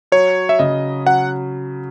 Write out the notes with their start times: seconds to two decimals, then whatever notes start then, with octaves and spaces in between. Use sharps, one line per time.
0.12 F#3 C#5
0.49 E5
0.59 C#3 D#5
1.06 F#3 F#5